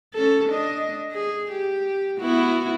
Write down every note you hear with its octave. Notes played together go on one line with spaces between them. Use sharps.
C#4 A4
D4 D#5
G#4
G4
B3 E4 F#4